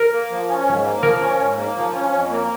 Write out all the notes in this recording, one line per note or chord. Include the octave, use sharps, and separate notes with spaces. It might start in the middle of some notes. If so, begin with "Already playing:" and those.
Already playing: A#4
A#3
F3
C#4
G#2
A#3
F3 A#4
C#4
G#2
A#3
F3
C#4
F2
A#3